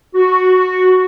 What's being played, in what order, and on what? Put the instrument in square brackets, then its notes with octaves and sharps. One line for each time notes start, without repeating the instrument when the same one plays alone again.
[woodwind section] F#4